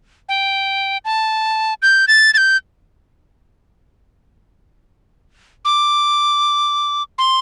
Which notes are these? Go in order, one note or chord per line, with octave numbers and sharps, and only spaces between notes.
G5
A5
G6
A6
A6
G6
D6
C6